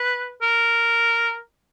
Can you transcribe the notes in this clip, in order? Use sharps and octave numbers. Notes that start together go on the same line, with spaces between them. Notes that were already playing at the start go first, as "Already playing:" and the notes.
Already playing: B4
A#4